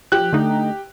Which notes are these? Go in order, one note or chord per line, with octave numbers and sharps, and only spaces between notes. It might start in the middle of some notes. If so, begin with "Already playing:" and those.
F3 G4 F#6
D3 A3 D#4